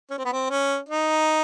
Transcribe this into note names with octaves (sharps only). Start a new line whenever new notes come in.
C#4
C4
B3
C4
C#4
D#4